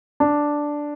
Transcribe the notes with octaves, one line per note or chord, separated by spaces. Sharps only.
D4